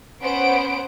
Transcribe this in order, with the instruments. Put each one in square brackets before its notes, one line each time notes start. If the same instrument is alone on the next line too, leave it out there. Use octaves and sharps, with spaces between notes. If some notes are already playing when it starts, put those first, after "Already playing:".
[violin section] B3 C#4 C5 F#5 D7